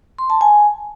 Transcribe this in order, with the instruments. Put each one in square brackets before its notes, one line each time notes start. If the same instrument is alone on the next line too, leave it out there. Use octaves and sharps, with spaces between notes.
[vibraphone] C6
A5
G#5